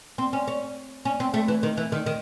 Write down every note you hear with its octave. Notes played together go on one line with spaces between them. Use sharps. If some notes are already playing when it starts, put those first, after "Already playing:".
C4
C#4
C#4
C#4
C4
A3
E3
D#3
E3
D#3
D#3